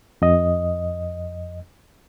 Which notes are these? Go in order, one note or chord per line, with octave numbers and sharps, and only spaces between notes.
F2 D#5